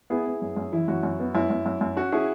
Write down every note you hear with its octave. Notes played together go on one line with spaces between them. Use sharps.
B3 E4 G#4
B3
F#2
F#2
E3 E4
F#2 F#4
F#2
B3
F#2 E4
F#2
F#2
F#2
C#4 F#4
C#4 E4 G#4